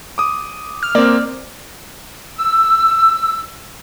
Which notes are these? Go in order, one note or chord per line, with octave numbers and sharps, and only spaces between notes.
D6 D#6
F6
A#3 C4 D5
E6